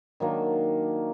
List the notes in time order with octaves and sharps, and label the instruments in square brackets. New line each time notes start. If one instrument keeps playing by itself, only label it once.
[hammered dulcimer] D#3 F#3 A#3 D4